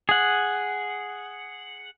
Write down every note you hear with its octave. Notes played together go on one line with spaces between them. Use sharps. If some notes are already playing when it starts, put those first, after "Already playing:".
G#4 F#5